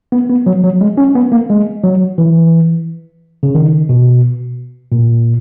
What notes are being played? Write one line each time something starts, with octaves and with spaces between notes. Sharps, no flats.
B3
B3
F#3
F#3
G#3
C#4
B3
A#3
G#3
F#3
E3
C#3
D#3
B2
A#2